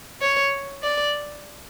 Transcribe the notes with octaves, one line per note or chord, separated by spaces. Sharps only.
C#5
D5